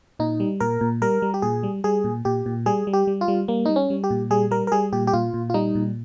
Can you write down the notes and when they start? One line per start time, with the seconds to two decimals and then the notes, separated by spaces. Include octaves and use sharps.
0.19 A#2 D#4
0.40 G3
0.60 A#2 A#4
0.81 A#2
1.02 G3 A#4
1.22 G3
1.34 G4
1.42 A#2 G#4
1.63 G3
1.84 G3 G#4
2.04 A#2
2.25 A#2 G4
2.46 A#2
2.66 G3 G#4
2.87 G3
2.93 G4
3.07 G3
3.21 F4
3.28 G3
3.48 G3 A#3
3.66 G3 D#4
3.76 C#4
3.90 G3
4.04 G4
4.10 A#2
4.31 G3 G#4
4.51 G3 A#4
4.67 A#4
4.72 G3 G#4
4.93 A#2 G4
5.07 G4
5.13 A#2 F4
5.34 A#2
5.50 F4
5.54 G3 D#4
5.75 A#2